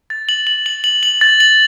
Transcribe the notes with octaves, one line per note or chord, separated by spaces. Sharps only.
A6
F#7
F#7
F#7
F#7
F#7
A6
F#7